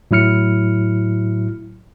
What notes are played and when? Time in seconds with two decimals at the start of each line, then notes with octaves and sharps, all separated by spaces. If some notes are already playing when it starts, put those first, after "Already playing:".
0.11 A2 F#3 E4 F6 C#7